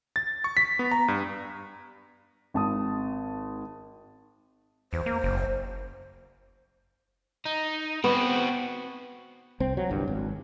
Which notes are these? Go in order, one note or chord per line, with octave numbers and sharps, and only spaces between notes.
A6
C#6
B6
B3
A#5
G2
G#1 A5 D#6
E2 C5
A#3
F#1
D#4
B3 C4 F#4
C2 C4
F#3
G1 C2 G2
G#1